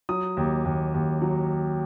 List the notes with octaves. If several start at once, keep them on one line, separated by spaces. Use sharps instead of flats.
F#3 D#6
D#2
D#2
D#2
F#3